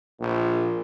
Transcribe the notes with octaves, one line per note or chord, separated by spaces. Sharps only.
A#1 A#2